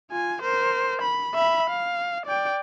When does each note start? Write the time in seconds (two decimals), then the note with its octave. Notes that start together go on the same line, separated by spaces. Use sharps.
0.11 F4 G#5
0.42 A#4 C5
1.02 B5
1.35 E5 B5
1.70 F5
2.26 D5 G5